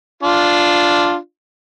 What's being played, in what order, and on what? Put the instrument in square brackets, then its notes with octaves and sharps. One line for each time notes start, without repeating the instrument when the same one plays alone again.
[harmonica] D4 F4